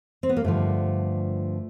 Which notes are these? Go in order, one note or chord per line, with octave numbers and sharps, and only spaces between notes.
C4
B3
A#3
G2 D3 F3 A3